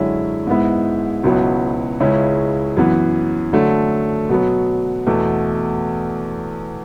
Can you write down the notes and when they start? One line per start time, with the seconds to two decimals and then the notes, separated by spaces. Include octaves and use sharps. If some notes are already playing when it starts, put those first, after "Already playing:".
Already playing: F#2 D3 G#3 C#4 E4
0.47 G#2 G#3 B3 E4
1.23 C#2 B2 F#3 B3 E4
2.00 C#2 C#3 G#3 C#4 E4
2.77 F#2 E3 B3
3.53 D3 F#3 A3
4.29 B2 F#3 B3
5.06 E2 B2 A3